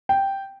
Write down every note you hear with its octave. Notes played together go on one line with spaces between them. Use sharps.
G5